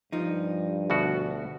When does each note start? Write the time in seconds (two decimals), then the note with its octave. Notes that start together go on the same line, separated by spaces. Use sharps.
0.12 G2 F3 D#4
0.90 D2 B2 F#4